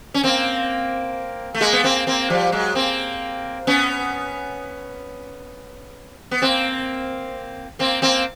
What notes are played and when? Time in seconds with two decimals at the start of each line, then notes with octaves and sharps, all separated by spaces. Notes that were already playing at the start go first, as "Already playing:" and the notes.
0.14 C#4
0.23 A#3 C4
1.55 A3
1.61 G#3 A#3
1.73 B3
1.84 A#3 C4
2.07 A#3 C4
2.30 F3 G3
2.52 F#3 G#3
2.75 A#3 C4
3.67 B3 C#4
6.31 B3
6.42 A#3 C4
7.79 A#3 C4
8.02 A#3 C4